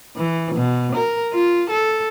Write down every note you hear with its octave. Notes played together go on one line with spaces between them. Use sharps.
E3
B2
A#4
F4
A4